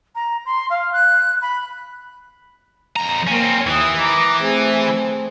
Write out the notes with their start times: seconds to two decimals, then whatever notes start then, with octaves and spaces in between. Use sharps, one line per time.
0.15 A#5
0.46 C6
0.70 F5
0.93 F#6
1.42 B5
2.96 F2 A#5
3.27 A#3 C4 C#4 A#4
3.67 D#2 E3 D#6
3.97 A#5 D6
4.43 A3 C4 G#4